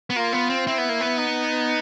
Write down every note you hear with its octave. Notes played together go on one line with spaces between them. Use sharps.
B3
A#3 F4
B3
C4
C4 E4
B3
A#3
B3
D#4